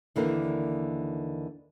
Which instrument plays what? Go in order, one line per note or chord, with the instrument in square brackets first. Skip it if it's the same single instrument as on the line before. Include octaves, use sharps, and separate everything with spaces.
[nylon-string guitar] D#2 D3 E3 A#3 A#4 D5